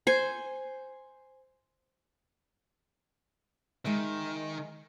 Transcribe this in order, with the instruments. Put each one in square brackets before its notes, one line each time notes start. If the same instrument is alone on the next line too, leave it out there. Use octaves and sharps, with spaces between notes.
[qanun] C5 G#5
[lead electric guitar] D#3 [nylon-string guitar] G#3 E5